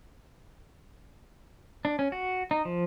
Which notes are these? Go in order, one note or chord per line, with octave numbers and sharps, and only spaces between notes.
D4
C#4
F#4
D#4
F3